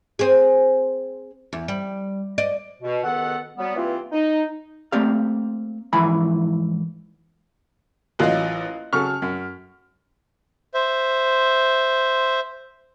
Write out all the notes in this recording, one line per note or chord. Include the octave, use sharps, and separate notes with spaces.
C4 G#4
E2
G3
D5 D#5
B2
C#2 B2 D#3 B3 A4 F#5
F#3 G3 B3
G2 E3 A#3 C4 F4
D#4
A3 A#3 C4 G4 D5 F5
G#2 E3 F3 E4 G#5 B5
A1 F#3 A#3 F4 D#5 F#6
C#3 F#3 A4 C#6 F6
F#2
C5 E5